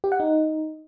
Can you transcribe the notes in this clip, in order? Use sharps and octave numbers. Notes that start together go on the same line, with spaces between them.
G4
F#5
D#4